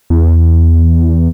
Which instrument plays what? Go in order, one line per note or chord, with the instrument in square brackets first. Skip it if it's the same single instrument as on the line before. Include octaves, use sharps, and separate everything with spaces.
[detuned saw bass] E2